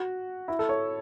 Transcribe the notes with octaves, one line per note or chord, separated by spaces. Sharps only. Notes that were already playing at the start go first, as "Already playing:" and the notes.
Already playing: F#4
E4
A4
C#5